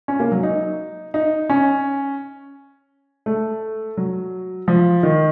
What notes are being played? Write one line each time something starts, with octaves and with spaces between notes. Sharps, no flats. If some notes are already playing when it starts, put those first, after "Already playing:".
C#4
A#3
F#3
D#4
D#4
C#4
A3
F#3
F3
D#3